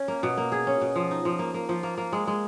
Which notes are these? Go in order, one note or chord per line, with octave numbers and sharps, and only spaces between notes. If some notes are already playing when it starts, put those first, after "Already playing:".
Already playing: C#4
A#3
B2
A#3
G#4
C#4
B2
F3
D#4
F3
A#3
A#3
F3
A#3
A#3
G#3
G#3